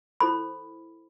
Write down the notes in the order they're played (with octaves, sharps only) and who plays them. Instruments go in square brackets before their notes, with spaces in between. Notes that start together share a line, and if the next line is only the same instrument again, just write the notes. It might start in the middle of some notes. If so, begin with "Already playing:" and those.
[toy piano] E4 A4 C5 B5